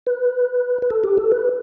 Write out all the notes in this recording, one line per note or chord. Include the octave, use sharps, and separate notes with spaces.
B4
B4
A4
G4
A4
B4